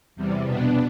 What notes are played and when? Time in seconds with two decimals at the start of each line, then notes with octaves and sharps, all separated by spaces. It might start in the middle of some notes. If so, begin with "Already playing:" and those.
0.16 E2 C3 G3
0.45 B2 B3 D4